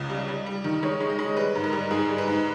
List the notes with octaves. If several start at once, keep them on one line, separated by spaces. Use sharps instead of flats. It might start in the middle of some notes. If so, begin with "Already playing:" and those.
Already playing: C#2 C#3 D#5
G3
G3
G3
D#3
G#3 C#5
G#3
D#5
G#3
G3 B4
G#2
A#4
G3
G#2 G#4
G3
B4
G#2